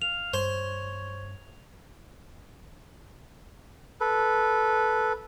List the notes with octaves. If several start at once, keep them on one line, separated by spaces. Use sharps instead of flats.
F5 F7
G2 C5 C#5
A4 B4